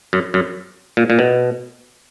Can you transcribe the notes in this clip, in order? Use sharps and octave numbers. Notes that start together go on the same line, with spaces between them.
F#2
F#2
A#2
A#2
B2